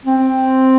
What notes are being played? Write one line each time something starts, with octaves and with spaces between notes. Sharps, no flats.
C4